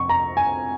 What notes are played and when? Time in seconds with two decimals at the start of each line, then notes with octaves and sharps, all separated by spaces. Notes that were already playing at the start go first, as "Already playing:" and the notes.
Already playing: F2 C3 C#6
0.09 A#5
0.37 G#5